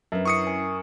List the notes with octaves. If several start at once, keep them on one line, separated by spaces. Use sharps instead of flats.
F#2 D4 B4
C#4 E4 C#6 D#6 C7 C#7
A#4 G#5